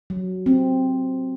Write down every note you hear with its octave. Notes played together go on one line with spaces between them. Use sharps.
F#3
C4